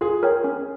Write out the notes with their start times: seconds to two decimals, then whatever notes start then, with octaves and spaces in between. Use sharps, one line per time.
0.01 F4 G#4
0.23 A#4 C#5 G5
0.44 C#4